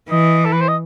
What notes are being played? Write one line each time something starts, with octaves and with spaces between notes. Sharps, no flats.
E3 D#5
A4
B4
C5
D#5